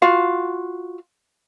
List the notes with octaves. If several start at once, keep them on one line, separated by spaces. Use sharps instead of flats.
F4 F#4 F5